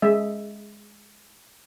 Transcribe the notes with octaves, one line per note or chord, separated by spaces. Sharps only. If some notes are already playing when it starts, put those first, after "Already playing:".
G#3 E5